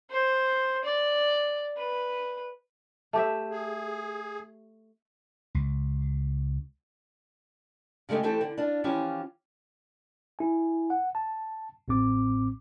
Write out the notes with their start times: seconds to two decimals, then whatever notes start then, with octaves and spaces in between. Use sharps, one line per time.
0.11 C5
0.85 D5
1.77 B4
3.13 A3 G4 E5
3.51 G#4
5.55 C#2
8.09 C#3 G#3 A3 D#4 G4
8.23 E3 A3 C4 G4 A4
8.41 D3
8.57 D4 F4
8.84 E3 F3 C#4 F4 G4
10.39 E4 G#5
10.90 F#5
11.15 A5
11.88 A1 A2 C4 D6